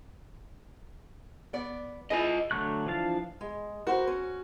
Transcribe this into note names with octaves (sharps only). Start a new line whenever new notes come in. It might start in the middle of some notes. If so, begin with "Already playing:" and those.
B3 D5
E4 F4 G#4 B4 D#5
D3 F#3 A3 C#6 F#6
E3 F3 D4 F5 A5
G#3
F#4 A#4 C5
C#4